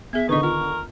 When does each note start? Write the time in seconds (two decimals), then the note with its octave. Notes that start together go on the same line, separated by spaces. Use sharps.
0.13 B3 G#4 E5
0.29 D3 D#3 D#4 B4 D#5 C#6
0.43 F4 A#4